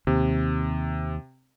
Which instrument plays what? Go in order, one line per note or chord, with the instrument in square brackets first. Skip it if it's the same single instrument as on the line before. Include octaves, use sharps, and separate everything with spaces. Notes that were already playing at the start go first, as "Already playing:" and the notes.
[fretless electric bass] D#2 [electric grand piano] C3